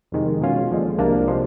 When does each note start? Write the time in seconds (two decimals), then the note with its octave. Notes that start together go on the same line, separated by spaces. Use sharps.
0.12 F2 C3 D#3 G#3
0.41 B2 G#3 C#4 F4
0.70 D#2 D3 F3 G#3
0.98 C2 C3 F3 A#3 D4
1.27 C3 F3 G#3